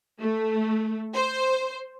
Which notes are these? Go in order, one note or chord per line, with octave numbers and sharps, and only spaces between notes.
A3
C5